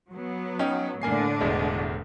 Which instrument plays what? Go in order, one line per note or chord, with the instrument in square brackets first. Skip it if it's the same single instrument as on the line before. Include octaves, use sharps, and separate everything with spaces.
[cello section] F#3 B3
[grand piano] C#4 D#4 G5
[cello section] A2 D3 D4 [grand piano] A#3 G#5 C7
[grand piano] E1 E2 G#3